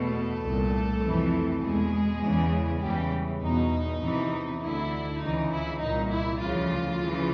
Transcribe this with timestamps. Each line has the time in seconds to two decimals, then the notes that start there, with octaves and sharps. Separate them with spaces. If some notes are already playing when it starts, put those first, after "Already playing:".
Already playing: E2 B2 A3 A4
0.42 C2 A#2
1.01 F2 C3 E3
1.61 E2 B2 G#3 G#4
2.22 E2 C#3 E3
2.81 E2 C#3 E3 G3 G4
3.41 E2 B2 D#4
4.01 E2 C3 E3
4.62 D2 D3 E4
5.20 C#2 C#3 E3 D#4
5.51 E4
5.81 C2 A#2 D#4
6.10 E4
6.40 D2 C#3 E3 F3 F4
7.01 C#3 E3